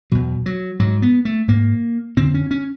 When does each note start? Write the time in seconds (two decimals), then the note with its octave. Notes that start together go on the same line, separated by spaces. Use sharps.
0.12 E2 B2 F#3
0.46 F#3
0.79 G#2 F#3
1.02 B3
1.25 A3
1.48 G#2 A#3
2.17 F2 D3 C4
2.34 C#4
2.51 C#4